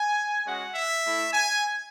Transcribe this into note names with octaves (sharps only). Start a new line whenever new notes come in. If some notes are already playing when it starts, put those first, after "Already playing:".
Already playing: G#5
G#3 C#4 F#4 F#5
E5
A3 E4
G#5